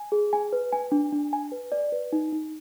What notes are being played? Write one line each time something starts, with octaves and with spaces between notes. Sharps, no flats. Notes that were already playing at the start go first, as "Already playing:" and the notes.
Already playing: G#5
G#4
G#5
B4
G#5
D4
D4
G#5
B4
D5
B4
D#4
D#4